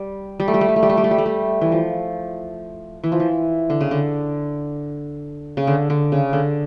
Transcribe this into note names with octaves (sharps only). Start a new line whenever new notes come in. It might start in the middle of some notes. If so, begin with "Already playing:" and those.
Already playing: G3
G3
A3
G3
A3
G3
A3
G3
A3
G3
A3
G3
A3
G3
E3
F3
E3
F3
E3
D3
C#3
D3
C#3
D3
D3
C#3
D3